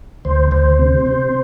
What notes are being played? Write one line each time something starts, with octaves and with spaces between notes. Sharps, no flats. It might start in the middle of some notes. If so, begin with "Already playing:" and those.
D2 C5
D2 C5
C3
C3